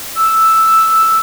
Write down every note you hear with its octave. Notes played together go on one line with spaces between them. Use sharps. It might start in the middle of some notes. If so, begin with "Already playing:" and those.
E6